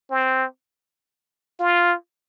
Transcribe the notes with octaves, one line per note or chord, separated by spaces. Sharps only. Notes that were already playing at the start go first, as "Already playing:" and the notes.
C4
F4